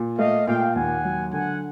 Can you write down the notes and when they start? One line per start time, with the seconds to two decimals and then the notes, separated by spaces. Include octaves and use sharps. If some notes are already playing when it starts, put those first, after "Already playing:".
Already playing: A#2
0.19 A3 D#5 F5
0.47 A#2 F5 G5
0.75 D#2 F#5 G#5
1.04 F#3
1.32 D3 F#5 G#5